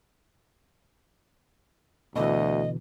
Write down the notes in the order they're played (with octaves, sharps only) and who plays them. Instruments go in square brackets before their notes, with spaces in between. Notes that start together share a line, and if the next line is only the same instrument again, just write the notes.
[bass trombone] D2 [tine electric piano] B2 D3 E3 [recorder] D#5